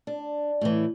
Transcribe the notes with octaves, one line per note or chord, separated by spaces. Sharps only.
D4
A2 E3